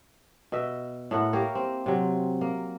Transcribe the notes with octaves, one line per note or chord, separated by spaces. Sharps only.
B2 D#5 E5
A2 E4 A#4 F#5
A#3 G4 A#4 C#5
C4
C3 F#3
A#3